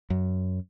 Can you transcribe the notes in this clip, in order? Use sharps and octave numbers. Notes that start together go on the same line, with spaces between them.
F#2